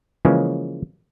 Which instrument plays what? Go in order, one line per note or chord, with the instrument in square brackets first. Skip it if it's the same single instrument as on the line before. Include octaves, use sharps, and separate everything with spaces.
[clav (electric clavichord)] C#3 E3 F3 G#3 A#3 C#4